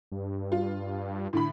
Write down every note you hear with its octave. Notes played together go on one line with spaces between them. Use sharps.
G2
F4
A2 D3 B5